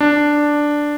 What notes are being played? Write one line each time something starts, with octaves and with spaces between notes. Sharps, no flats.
D4